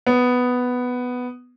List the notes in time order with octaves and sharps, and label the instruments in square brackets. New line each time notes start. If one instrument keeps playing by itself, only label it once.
[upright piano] B3